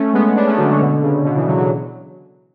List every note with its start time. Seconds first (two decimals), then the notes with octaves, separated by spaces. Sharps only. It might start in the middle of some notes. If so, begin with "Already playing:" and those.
Already playing: A3 C#4
0.13 G#3 B3
0.36 B3 D4
0.47 A3 C#4
0.57 D3 F#3
0.70 D3 F#3
0.81 B2 D3
1.02 C#3
1.25 B2 D3
1.36 C#3 E3
1.47 D3 F#3
1.57 D3 F#3